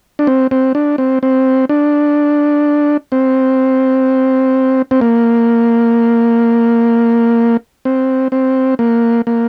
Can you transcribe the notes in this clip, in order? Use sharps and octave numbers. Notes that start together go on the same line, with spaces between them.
D4
C4
C4
D4
C4
C4
D4
C4
C4
A#3
C4
C4
A#3
A#3